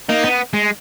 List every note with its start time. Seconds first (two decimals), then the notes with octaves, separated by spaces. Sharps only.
0.09 A#3 D#4
0.24 B3
0.53 G#3